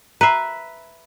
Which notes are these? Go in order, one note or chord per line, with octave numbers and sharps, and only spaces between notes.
B4 E5 A#5 C7